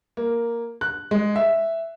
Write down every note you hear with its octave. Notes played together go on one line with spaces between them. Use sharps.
A#3
F#6
G#3
E5